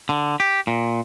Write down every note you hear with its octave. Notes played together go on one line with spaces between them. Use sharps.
D3
G4
A#2